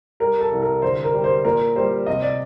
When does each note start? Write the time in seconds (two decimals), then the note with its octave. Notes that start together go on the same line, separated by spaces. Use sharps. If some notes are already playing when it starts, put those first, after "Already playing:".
0.20 G3 A#4
0.41 A4
0.52 C2
0.62 A#4
0.82 D3 C5
1.04 A#4
1.14 G3
1.24 C5
1.45 A#2 A#4
1.76 G3 C5
2.06 C3 D#5
2.22 D5